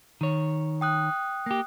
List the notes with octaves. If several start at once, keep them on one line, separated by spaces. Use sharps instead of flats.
D#3 C#5
G5 D#6 F#6
A#3 G4